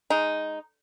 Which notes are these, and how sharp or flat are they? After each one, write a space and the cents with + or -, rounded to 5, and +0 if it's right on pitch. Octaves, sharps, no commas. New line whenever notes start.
G#3 +0 D#4 +0